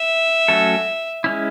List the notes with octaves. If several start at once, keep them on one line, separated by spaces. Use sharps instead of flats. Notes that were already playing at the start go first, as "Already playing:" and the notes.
Already playing: E5
F#3 A3 C#4 F#4 A4
G#3 C#4 E4